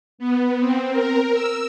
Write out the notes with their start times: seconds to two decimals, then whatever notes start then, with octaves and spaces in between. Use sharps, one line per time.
0.18 B3
0.59 C4
0.92 A#4
1.33 E6